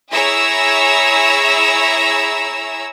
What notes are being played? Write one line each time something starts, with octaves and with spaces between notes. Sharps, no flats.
E4 G#4 C#5 A#5 E6